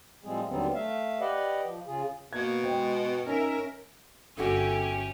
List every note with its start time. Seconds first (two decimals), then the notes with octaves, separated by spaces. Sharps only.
0.24 A2 F3 G3 G#3 C4 G#4
0.48 D#2 D3 F#3 G3 B3 C4
0.74 A3 E5 F5
1.20 G4 B4 D5 D#5 F#5
1.65 F3
1.87 C#3 F4 G#4
2.33 B2 A#3 G#6
2.64 G#3 C5 D#5 G5
3.27 C#4 D#4 A#4 E5
4.37 G1 C#4 E4 F#4 G4 A4